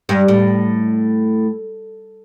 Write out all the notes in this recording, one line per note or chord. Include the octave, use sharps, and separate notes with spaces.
G2
A2